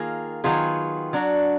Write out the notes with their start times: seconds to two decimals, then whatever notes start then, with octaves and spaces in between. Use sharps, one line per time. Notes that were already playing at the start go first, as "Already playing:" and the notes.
Already playing: D#3 A#3 F4 G#4
0.44 D#3 F#3 B3 F4 G#4
1.13 F#3 D4 F#4